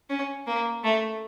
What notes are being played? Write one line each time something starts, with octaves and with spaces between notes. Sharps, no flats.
C#4
A#3
A3